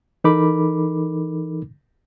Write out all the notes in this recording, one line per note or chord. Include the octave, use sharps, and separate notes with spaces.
E3 D#4 A4 A#4 B5 D6